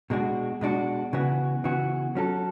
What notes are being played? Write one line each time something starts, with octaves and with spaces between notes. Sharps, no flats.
B2 G#3 D4 F#4
B2 G#3 D4 F#4
C#3 E3 B3 F#4
C#3 E3 B3 F#4
F#3 C#4 F#4 A4